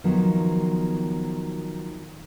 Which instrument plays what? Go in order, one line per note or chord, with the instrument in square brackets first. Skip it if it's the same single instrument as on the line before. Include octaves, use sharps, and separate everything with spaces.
[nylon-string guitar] D#3 F3 F#3 B3